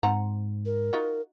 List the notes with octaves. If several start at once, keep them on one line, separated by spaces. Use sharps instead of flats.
G#2 C4 F#5 A#5
A#4
D#4 F4 F#4